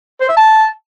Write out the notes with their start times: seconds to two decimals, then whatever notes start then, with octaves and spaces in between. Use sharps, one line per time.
0.21 C5
0.29 E5
0.37 A5